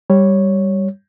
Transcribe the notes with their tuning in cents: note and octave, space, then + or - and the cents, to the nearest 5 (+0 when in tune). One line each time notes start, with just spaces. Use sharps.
G3 +0 C#5 +0